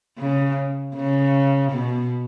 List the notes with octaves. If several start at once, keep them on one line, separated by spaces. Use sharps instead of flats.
C#3
C#3
B2